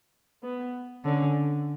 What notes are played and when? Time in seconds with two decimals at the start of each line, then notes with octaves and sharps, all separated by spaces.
0.42 B3
1.04 D3 C#4